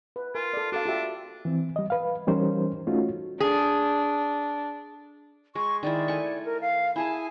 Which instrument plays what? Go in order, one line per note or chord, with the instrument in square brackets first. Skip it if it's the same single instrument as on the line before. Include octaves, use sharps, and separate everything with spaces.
[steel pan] B4
[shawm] F4 [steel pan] A#4 G#5
[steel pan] A4 D5
[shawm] D4 [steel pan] F#4 A4 F5
[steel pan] F4 G4 E5
[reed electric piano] E3 C4
G3 D#5
B4 F5
E3 G3 C#4 D#4 A#4 C5
A3 C#4 D#4 F4 F#4
[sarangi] D4 [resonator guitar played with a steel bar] G#4
[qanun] G#3 [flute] C#6
[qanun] D#3 G#3 E4 [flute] D5
[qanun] A3 G#5 C#6
[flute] A#4
F5
[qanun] E4 G#4 A5 [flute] G#5